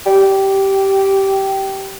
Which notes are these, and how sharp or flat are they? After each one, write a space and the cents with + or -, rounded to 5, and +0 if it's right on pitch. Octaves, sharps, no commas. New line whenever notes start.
G4 -15